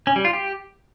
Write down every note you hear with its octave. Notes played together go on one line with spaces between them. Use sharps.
C#4
G3
F4
G4